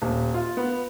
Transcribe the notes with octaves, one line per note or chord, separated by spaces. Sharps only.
D#1
F4
B3